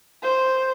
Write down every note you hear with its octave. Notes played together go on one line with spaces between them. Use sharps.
C5